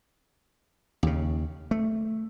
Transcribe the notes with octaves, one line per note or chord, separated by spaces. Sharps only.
D#2 C#3
A3